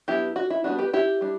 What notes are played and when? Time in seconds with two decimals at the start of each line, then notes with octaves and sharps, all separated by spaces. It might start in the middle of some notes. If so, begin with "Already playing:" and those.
0.08 F#3 B3 D4 E4 G4
0.36 F#4
0.50 E4
0.64 G3 B3 D4 F#4
0.78 G4 B4
0.93 E4 G4
1.21 G3 D4